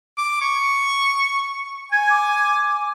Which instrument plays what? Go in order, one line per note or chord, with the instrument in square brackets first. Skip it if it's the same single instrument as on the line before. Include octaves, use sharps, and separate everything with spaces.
[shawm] D6
C#6
[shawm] G#5 [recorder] G#6
[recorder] D6